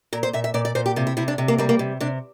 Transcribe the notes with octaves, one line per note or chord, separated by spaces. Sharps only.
A#2 A#4
C5
A#2 E5
E5
A#2 D5
D5
A#2 C5
G4
C3 F4
E4
C3 E4
D4
C3
A#3
G3 A#3
A#3
C3
C3 D4